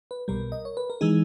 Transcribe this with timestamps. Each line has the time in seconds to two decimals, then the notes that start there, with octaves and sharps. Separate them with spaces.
0.11 B4
0.28 B1 B2 G3 A#4
0.52 D#5
0.65 C#5
0.77 B4
0.90 A#4
1.01 E3 G#3 D#4 G#4